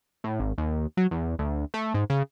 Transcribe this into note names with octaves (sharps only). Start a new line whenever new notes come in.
A2
G#1
D#2
F#3
E2
D2
A3
G#2
C#3